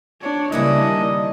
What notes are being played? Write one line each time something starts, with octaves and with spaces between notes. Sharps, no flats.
D4 C#5
C#3 E3 G3 A#3 C#4 D4 E4 D#5
D#3